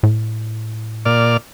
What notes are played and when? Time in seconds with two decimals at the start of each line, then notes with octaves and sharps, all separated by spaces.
0.03 A2
1.05 A#2 D5 F6